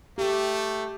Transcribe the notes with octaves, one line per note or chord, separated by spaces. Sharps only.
A3 G4